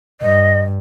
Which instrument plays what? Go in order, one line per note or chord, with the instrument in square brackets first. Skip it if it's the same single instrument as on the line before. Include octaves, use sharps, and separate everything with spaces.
[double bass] G2 [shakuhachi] D#5